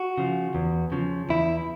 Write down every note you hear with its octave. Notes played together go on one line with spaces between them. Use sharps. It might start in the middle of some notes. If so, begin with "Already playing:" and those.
Already playing: F#4
C#3 F3
E2
C#3 F3
E2 E4